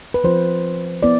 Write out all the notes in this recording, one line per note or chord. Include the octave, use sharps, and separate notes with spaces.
B4
F3 C4 F4 C5
B3 E4 D5